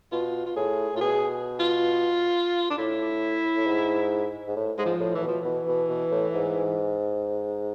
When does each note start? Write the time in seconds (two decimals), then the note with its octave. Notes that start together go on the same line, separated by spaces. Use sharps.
0.12 B2 F4
0.46 F4
0.56 A2 G#4
0.94 A2 F4
1.01 B2 G#4
1.60 F4
2.70 D4
2.78 A2 E4
3.55 A2
3.67 G#2
4.47 G#2
4.56 A2
4.78 G#2 G#3
4.85 F3
5.00 A2
5.15 A2 E3
5.22 B2
5.28 F3
5.41 B2 E3
5.67 B2
5.89 B2
6.11 A2
6.33 G#2